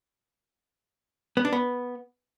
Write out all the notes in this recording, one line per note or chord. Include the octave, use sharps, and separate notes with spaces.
B3
D4
B3